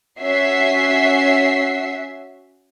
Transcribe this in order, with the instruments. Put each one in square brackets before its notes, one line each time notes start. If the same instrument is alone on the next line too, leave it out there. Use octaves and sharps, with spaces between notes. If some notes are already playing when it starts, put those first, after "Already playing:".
[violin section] C#4 F#4 E5 C7